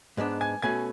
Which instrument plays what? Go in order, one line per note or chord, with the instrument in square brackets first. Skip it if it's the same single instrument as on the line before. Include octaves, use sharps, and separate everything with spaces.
[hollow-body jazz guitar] G#2 G#3 B3 D4
[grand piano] G#5 G#6
[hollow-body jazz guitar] B2 A3 C#4 [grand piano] G#5 G#6